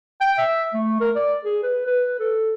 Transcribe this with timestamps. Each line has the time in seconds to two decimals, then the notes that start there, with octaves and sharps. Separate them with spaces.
0.21 G5
0.38 E5
0.74 A3
1.00 A#4
1.16 D5
1.44 G#4
1.63 B4
1.87 B4
2.19 A4